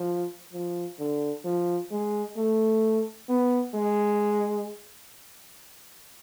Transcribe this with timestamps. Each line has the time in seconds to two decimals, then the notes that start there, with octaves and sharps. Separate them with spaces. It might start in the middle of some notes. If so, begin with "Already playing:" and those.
Already playing: F3
0.53 F3
0.99 D3
1.45 F3
1.91 G#3
2.37 A3
3.29 B3
3.74 G#3